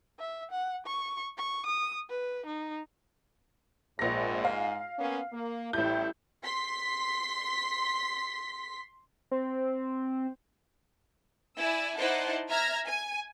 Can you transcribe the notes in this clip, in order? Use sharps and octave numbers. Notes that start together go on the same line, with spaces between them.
E5
F#5
C#6
C#6
D#6
B4
D#4
A#1 G#2 A#6
F5
A#3 B3 C#4
A#3
A1 A2 G3 E4 G6
C6 B6
C4
E4 D5 G#5 E6
D#4 E4 C5 D5 F#5 A5
E5 A#5 F6 G#6 A#6
G#5